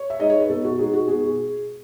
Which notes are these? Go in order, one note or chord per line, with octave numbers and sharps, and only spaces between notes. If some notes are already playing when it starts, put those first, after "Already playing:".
Already playing: C#5
E5
G#3 D#4 D#5
C#5
B4
B2 A4
F#4
G#3 D#4 G#4
F#4
B2 G#4